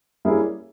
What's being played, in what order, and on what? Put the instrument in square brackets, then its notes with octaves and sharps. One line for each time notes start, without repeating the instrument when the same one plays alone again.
[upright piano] G3 A#3 C#4 E4 G#4